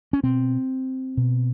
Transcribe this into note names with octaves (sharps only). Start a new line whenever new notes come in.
C#4
B2 C4
B2